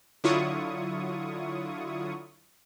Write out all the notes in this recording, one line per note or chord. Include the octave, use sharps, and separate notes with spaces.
D3 F#3 E4 F4 C#6 D#6